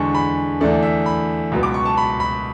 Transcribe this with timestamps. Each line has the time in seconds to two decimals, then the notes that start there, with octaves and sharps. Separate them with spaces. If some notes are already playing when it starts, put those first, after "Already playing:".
Already playing: E2 D3 G#3 A5 C#6
0.15 B5
0.61 E2 D3 A3 D5
0.83 E5
1.06 B5
1.52 C#2 B2 F#3 B3
1.63 D6
1.74 C#6
1.85 A5
1.97 B5
2.20 B5